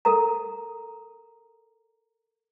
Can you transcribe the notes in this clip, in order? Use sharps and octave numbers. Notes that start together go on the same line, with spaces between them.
A4 A#4 A#5